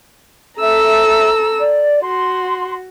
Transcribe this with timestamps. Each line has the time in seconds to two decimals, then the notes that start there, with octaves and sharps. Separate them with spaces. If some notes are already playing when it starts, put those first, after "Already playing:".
0.59 A4 E5 A#5 E6
1.59 D5
2.02 F#4 C6